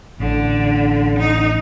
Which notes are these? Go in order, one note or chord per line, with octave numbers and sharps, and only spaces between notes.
A1 D3
D#4